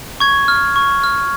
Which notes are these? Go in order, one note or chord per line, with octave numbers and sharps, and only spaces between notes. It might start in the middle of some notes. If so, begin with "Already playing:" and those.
C#6 G#6
F6
C#6
F6